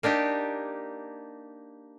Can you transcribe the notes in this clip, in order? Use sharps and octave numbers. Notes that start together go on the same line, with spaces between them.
A#3 D4 D#4 G4